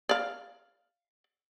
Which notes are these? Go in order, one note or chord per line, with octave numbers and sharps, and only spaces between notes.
D5 F5